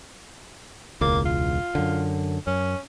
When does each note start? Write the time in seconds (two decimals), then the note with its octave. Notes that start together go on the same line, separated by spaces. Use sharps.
1.01 E1 C#2 A#3
1.25 F4
1.75 F#2 D3
2.47 F#2 C#4